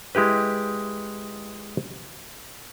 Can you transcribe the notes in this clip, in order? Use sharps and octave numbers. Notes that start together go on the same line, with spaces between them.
G#3 E4 G4 B4